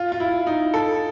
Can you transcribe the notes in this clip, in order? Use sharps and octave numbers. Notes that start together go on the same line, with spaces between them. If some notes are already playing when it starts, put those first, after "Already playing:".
Already playing: F4
F4
E4
D#4
A4